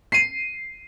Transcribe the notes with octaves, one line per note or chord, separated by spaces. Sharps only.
C7 D#7